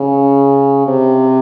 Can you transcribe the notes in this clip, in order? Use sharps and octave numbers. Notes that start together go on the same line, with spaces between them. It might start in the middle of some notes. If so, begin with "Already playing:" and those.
Already playing: C#3
C3